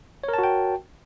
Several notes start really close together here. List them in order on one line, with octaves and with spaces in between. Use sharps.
C#5 A#4 A5 F#4 G5